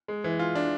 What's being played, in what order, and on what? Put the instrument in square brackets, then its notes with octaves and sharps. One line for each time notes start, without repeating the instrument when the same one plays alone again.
[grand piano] G#3
E3
F4
D4